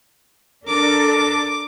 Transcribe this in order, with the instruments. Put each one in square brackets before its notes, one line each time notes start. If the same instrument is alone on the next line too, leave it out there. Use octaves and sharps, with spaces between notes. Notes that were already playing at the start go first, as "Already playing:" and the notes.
[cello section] D4 A4 A#4 [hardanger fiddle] D6